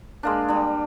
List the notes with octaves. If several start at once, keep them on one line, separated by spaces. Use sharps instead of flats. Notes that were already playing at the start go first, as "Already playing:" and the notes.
G#3 A#3 D4
G3 D4